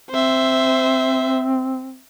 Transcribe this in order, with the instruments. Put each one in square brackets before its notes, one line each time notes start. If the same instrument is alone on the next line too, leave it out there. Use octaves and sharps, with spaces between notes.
[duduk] C4 [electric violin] C5 E5